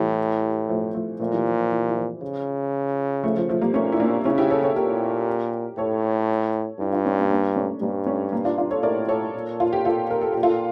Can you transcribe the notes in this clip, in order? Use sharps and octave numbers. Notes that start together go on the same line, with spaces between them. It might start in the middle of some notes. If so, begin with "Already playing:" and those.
Already playing: A2 E3 G3
F3 A3
F3 A3
A#2 F3 A3
E3 G3
F3
F3
E3
E3
F3
C#3
F3 A3
F3
F3 A3
G3 A#3
A#2 A3 C#4
E4
A#3 D4
C#3 C#4 E4
E4 G4
A4 C#5
A4 C#5
A#2 G4 A#4
A2 A4 C#5
G2 E4 G4
D4 F4
C#4 E4
A#3 D4
A#3 D4
A3 C#4
G2 G3 A#3
A3 C#4
G3 A#3
D4 F4
D4 F4
A4 C#5
A2 A#4 D5
A4 C#5
A#2
F4
G4
F4 A4
A#4
A4
A#2 G4
F4 A4